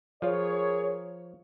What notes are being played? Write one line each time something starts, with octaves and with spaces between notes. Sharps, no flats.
F3 F4 G#4 A#4 C#5